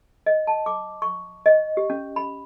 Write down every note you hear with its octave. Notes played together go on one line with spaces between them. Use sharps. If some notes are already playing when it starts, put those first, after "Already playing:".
D#5
A5
D6
C#6
D#5
G4
C#4
B5